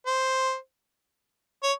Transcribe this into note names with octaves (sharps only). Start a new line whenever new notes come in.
C5
C#5